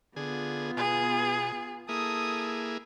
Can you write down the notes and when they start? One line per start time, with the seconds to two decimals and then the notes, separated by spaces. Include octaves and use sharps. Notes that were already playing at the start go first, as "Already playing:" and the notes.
0.16 D3 B3 F4 G#4
0.77 B2 G#4
1.89 A#3 E4 G#4 A4 D#6